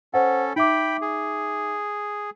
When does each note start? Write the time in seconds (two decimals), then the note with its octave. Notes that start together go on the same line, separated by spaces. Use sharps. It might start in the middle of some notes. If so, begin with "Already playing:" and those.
0.14 C#4 A4 C5 F#5
0.56 D#4 E5 G5 B5 D6
1.02 G#4